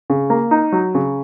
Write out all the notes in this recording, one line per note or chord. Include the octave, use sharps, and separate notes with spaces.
C#3
A#3
D#4
F#3
C#3